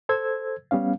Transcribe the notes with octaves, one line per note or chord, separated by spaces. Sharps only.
A4 C5 E6 G#6
G3 B3 C#4 F5